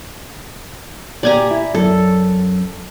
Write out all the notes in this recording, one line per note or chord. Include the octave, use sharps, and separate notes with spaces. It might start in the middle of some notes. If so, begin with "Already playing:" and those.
A#2 G4 D5 G#5 A#5
E4
F#2 A4